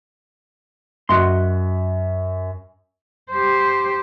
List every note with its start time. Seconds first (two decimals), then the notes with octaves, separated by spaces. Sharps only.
1.09 F#2 F#4 D#5 C6
3.31 G4 C5